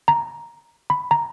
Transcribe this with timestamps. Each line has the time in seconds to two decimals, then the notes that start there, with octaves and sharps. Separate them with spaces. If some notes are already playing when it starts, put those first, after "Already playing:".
0.08 A#5
0.90 B5
1.11 A#5